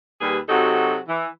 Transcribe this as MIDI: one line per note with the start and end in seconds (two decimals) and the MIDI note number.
0.21 0.38 39
0.21 0.38 55
0.21 0.38 68
0.21 0.38 71
0.49 0.98 48
0.49 0.98 54
0.49 0.98 63
0.49 0.98 66
0.49 0.98 69
1.08 1.26 52